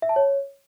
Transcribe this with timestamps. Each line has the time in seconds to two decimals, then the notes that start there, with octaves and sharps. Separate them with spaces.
0.02 E5
0.09 A5
0.16 C#5